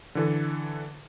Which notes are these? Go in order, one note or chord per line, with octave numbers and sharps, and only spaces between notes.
D3 E3 A4